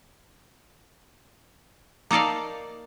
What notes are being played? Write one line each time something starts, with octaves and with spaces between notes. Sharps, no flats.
A#3 D#4 A4 D5 F5